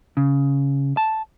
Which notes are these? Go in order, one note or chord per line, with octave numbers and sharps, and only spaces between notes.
C#3
A5